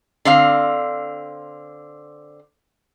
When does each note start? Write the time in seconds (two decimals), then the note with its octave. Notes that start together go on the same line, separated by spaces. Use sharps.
0.25 D3 C4 F5